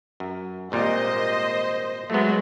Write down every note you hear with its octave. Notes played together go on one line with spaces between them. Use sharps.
F#2
G#1 A#2 G3 C5 D#5
F#3 G#3 A3 B3